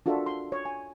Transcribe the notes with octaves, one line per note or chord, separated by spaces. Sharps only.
D4 F4 F#4 A4 A#4 E5
C6
C#5
G#5